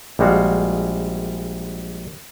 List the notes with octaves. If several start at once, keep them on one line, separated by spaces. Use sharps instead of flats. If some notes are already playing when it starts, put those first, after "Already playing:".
A#1 G3 G#3 F#4 F5